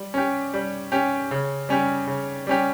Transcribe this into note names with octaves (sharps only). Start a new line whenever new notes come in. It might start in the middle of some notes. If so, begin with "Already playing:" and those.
Already playing: G3
C#4 G4
G3
C#4 G4
C#3
G3 C#4 G4
C#3
G3 C#4 G4